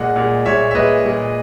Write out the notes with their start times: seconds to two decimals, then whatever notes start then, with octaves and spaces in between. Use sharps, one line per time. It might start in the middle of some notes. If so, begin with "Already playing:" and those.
Already playing: A#2 G#3 D#5 F#5
0.16 A#2 G#3
0.45 A#2 G#3 C#5 E5
0.71 E5
0.74 A#2 G#3 B4 D#5
1.04 A#2 G#3